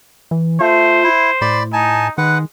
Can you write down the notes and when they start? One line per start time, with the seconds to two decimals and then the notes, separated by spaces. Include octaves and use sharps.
0.31 E3
0.60 A3 F4 C5
1.04 E4
1.41 A2 D5 B5
1.73 D#4 G#5 A5
2.18 D#3 G#3 B4 F#5